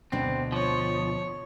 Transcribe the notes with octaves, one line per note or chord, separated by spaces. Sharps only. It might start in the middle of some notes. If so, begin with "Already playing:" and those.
D2 B2 C4 D4
F3 C#5